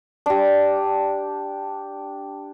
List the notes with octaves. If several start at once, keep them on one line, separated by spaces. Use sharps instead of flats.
D4 G4